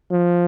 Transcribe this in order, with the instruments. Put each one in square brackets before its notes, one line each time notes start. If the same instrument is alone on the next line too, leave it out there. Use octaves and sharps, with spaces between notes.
[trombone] F3